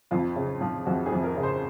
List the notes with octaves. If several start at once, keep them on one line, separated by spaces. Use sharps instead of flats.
F2 F4
C#3
F3
F2 F#4
G#4
F2
A#4
C#3
C5